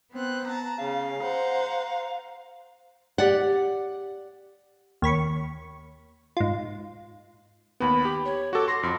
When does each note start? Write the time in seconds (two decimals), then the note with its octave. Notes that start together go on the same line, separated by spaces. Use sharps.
0.12 B3 C4 F#6
0.46 A5 A#5
0.79 C#3 F5
1.20 C5 F#5 A#5
3.18 G4 D5 F#5
5.02 D#2 C#5 B5 C#6
6.37 G#2 F4
7.80 D#2 B3 B5
8.05 G4
8.25 C#5
8.53 F#4 A4 D6
8.68 C6 A#6
8.83 F2 C6